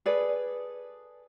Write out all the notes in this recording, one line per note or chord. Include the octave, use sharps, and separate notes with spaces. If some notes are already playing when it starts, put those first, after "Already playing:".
G#4 A4 B4 D5